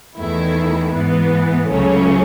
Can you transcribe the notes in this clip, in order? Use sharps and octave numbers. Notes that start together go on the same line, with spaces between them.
E2 D#3 A3 E4
G#2 E3 B3
C#2 C#3 F#3 A3 C#4